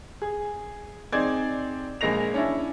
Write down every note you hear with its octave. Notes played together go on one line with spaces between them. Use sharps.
G#4
C4 D#4 G#4 D5 G#6
A#1 G#3 A#3 A#6 F7
C#4 D4 E4